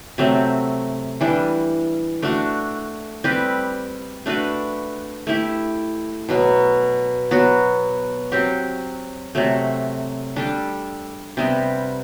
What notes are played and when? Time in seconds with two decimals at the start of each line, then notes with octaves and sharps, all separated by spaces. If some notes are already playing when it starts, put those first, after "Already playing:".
0.18 C3 F#3 A3 C4
1.21 E3 G3 D4
2.22 A3 D4 F#4
3.24 G3 C4 G4 B4
4.26 A3 D4 F#4 B4
5.27 A3 E4 G4
6.29 B2 F#3 B3
7.31 F#3 B3 F#4
8.32 F#3 C4 G4
9.35 C3 F#3 A3
10.36 G3 D4 A4
11.37 C3 G3 B3